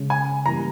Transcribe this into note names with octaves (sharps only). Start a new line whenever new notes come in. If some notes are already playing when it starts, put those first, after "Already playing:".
Already playing: C#3 G#3 C#4
G#5
G2 E3 G3 A#3 A#5